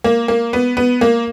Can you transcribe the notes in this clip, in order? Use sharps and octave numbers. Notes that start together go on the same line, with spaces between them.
A#3
A#3
B3
B3
A#3